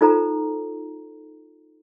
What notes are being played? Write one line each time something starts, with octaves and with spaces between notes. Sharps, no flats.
D#4 F4 A4 C5 A#5